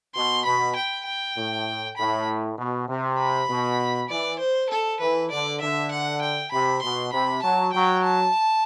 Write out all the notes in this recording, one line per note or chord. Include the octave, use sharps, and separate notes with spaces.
B2 C6
B2 B5
G5
G5
A2
A2 B5
B2
C3
B5
B2
E3 D5
C5
A4
E3 B4
D3 D5
D3 E5
F#5
G5
C3 B5
B2 C6
C3 B5
F#3 A5
F#3 G5
A5